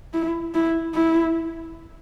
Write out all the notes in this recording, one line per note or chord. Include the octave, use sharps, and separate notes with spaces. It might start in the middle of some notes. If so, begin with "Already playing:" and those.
E4
E4
E4